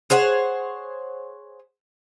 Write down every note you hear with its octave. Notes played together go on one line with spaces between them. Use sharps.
G#4 C5 C#5 F#5